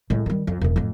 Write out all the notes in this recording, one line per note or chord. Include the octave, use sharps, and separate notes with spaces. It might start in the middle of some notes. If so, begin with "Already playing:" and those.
A2 G#3
D#3 G3
F2
E1 F2
F2 A2